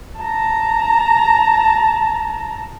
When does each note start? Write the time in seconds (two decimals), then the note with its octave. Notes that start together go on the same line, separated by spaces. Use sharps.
0.19 A5 A#5